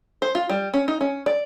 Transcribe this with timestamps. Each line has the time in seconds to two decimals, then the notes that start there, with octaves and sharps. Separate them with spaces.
0.22 C5
0.35 F4
0.49 G3
0.74 C#4
0.88 D#4
1.01 C#4
1.26 D5